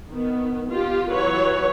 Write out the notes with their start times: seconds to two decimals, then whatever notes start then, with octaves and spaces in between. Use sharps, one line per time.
0.12 D#3 B3
0.72 F4 G4
1.11 E3 F#3 B4 C#5